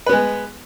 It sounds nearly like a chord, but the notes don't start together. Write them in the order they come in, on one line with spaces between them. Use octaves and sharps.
B4 B3 G#3